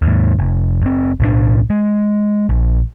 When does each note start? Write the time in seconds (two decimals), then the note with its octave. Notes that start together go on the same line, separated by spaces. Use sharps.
0.02 D#2 G#2
0.39 F1
0.81 F#1 C4
1.20 B1 A2 E3 D4
1.70 G#3
2.49 A#1